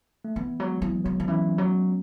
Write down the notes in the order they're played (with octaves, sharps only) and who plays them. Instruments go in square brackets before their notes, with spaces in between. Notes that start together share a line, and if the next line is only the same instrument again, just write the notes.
[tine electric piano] A3
[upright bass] E3 [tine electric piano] B3
[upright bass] F#3 [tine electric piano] G#3
[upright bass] E3 [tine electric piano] F#3
[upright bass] D#3 [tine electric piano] F#3
[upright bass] D#3
[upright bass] E3 [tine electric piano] C#4
[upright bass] F#3